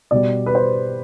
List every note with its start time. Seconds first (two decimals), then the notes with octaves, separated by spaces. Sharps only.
0.11 B2 G3 D5
0.46 B4
0.55 C5